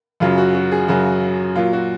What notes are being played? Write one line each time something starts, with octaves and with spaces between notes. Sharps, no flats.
F#2 C#3 F#3 F4
F#4
F#4
G#4
F#2 C#3 F#3 F#4
A#2 F#3 F4
F#4